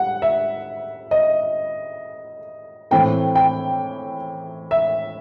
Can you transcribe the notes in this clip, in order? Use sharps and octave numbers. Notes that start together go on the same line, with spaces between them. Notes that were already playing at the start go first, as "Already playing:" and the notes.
Already playing: G3 F#5
E5
D#5
A2 E3 A3 C4 G5
G5
E5